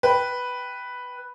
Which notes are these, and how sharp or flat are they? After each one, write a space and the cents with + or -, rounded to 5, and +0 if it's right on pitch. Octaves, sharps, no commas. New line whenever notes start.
B4 +0 G5 -5